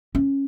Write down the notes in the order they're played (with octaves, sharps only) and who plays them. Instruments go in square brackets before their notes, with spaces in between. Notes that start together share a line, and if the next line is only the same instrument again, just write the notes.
[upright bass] C#4